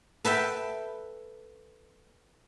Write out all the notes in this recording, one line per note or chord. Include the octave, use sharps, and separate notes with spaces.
A4 B4 E5 G5